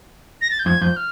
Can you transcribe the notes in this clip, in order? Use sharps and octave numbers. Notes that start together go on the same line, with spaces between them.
A#6
A6
G6
F2 G#6
F2 G6
F6